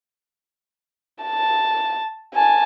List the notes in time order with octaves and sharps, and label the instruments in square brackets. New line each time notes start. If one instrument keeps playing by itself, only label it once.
[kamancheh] A5
G#5 A5